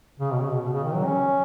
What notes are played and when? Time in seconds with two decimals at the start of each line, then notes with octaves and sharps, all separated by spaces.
0.20 C#3
0.32 B2
0.40 C#3
0.51 B2
0.62 B2
0.73 C#3
0.84 D#3
0.95 F#3
1.05 C#4